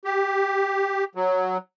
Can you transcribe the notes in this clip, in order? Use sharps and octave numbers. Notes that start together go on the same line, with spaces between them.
G4
F#3